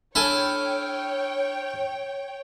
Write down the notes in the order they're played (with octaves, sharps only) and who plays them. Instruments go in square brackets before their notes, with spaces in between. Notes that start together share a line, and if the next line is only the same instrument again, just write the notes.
[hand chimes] D4 F6 [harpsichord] E4 A4 G#5 [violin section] C#5 G5